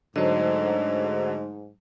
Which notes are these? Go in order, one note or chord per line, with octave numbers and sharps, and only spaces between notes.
G#2 D3 F#3 A3 C5 D#5